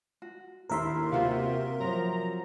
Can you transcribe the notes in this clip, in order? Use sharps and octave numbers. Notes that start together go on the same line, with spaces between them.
F#4
D#2 A3 D4 E4 A#4 E5 C6
C3 A#3 B3 F4 F#4 D5 F5
F3 F#3 A#5